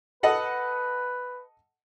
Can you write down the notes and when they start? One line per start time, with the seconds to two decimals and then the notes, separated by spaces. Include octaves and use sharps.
0.23 A4 B4 D#5 F#5